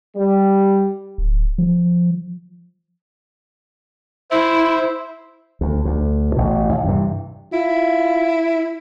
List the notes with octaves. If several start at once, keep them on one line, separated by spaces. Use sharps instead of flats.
G3
D1
F3
E4 C5 E5
D2
D2
A1 B2
D#2
G2 C3 E3
E4 F4